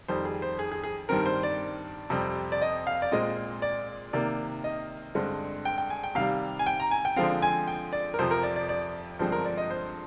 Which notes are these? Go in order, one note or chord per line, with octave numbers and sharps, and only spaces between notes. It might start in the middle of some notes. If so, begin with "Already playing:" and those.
F2 D#3 G3 C5
G#4
C5
G#4
G#4
G#4
G2 D#3 G3 C4 A#4
C5
D5
F2 C3 G3 C4
D5
D#5
F5
D5
A#2 G#3 C4 D#5
D5
C3 D#3 A#3 D5
D#5
G2 D3 G#3 C4
G5
G5
G#5
G5
C3 D#3 G3 F5
G#5
G5
A#5
G#5
G5
D3 F3 G#3 C4 F5
G#5
G5
D5
A#4
F2 C3 F3 C5
A#4
D5
D5
D5
G2 D3 F3 G#3 C4 C5
A#4
D5
D#5
C5